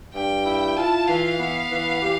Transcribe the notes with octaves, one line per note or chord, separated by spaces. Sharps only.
G2 G5
E4
F4 A5
E3 F5
B3
E3
G4